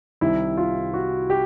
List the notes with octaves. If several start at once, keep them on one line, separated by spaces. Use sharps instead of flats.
C2 C3 D#3 E4
F4
F#4
G4